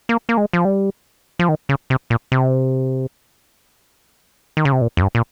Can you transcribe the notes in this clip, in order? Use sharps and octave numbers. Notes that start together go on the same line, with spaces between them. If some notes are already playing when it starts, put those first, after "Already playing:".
A#3
A#3
G#3
F3
G3
F3
D#3
C#3
C3
A#2
C3
D#3
C#3
C3
A#2
F2
G2
A#2